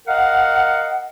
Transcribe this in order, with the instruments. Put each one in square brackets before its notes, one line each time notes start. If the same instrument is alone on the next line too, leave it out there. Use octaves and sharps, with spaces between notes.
[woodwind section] A#4 D#5 F5 F#5